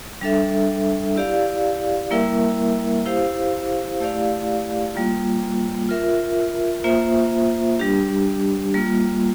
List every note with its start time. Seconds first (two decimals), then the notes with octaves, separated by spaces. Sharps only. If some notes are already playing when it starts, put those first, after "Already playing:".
0.21 G3 D4 A4 E5
1.16 E4 G4 D5 F5
2.11 G3 A#3 E4 A#4 E5
3.06 E4 G4 C5 F5
4.00 A3 E4 G4 D5 F5
4.95 G3 A#3 F4
5.89 F4 A#4 E5
6.84 A#3 F4 C5 E5
7.79 G3 D4 G4
8.74 G3 A#3 F4